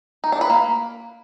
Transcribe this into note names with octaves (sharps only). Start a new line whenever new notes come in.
D#4
D4
B4
A#3